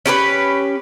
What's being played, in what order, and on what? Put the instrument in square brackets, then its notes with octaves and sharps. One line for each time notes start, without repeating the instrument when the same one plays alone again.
[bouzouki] C#4 G4 A4 B4